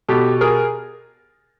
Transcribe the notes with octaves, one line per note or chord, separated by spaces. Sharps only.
B2 G4 A4
G#4 A#4